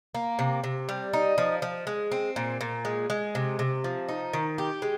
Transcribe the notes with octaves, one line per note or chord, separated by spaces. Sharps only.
A#3
C3
C3
G3
D#4
F3
F3
G#3
C4
A#2
A#2
G#3
G#3
C3
C3
F3
D#4
D#3
G4
G#3